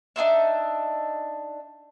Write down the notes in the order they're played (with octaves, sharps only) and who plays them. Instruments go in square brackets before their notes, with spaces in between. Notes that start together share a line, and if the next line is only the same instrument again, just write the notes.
[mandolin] D4 D#4 F4 E5